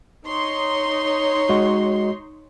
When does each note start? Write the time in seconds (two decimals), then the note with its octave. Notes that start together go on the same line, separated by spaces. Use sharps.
0.24 D#4 C#5 C6
1.49 G#3 F#4 D#5